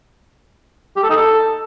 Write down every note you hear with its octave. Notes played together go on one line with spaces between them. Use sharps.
G4
A4
D#4
A4